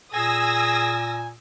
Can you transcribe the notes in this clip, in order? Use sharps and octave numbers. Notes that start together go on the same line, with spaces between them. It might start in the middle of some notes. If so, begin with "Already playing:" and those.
A#2 G#4 G#5 D#6 E6 A#6